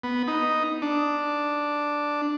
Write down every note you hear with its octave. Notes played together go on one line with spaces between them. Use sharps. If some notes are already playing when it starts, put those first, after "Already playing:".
B3
D#4
D4